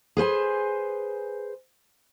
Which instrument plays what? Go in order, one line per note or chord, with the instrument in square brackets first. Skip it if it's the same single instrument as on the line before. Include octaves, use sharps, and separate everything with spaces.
[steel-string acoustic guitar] G#4 B4 C5 G#5